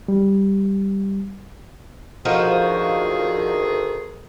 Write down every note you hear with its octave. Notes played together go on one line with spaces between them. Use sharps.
G3
D2 D#3 F3 D#4 F#4 G#4